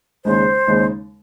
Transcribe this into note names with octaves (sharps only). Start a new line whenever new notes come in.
D#2 C#3 G#3 D#4 C5
D#2 C#3 G#3 D#4